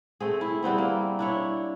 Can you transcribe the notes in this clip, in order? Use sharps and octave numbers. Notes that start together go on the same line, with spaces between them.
A3 C4 G#4
E4
G3 B3 C4 G#4
A#3
D4 E4 C#5